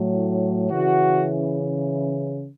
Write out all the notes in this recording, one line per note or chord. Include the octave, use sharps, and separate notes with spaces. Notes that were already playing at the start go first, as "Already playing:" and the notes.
Already playing: A2 F#3
C#3 E3 F#4